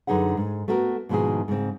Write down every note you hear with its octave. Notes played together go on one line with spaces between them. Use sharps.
F#2 D3 D#4 G#4 B4 F#5
G#2
A3 B3 F#4 A4 A#4
G#2 B2 D#3 F3 E4 G#4
G#2 C#3 C4